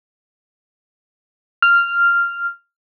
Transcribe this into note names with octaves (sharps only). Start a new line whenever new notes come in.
F6